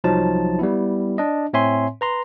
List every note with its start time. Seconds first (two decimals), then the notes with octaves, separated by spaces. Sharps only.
0.04 C2 F3 F#3 D#4 A5
0.59 G3 B3 E4
1.18 D4 D#5
1.53 A2 C4 C#5 E5 G#5 C6
2.01 B4 A#5 C6